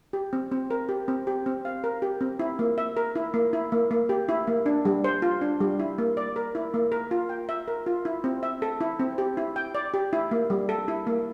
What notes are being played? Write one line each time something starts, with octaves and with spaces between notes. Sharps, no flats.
G4
C4
C4
A#4
G4
C4
G4
C4
F5
A#4
G4
C4
E4
A#3
E5
A#4
E4
A#3
E4
A#3
A#3
G4
E4
A#3
D4
G3
C5
F4
D4
G3
E4
A#3
D5
A#4
E4
A#3
A#4
F4
G5
E5
A#4
F4
E4
C4
E5
A4
E4
C4
G4
E4
G5
D5
G4
E4
A#3
G3
A4
E4
A#3